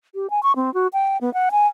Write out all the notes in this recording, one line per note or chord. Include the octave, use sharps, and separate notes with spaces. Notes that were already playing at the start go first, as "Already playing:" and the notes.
G4
G#5
C#6
C4
F#4
G5
B3
F#5
G#5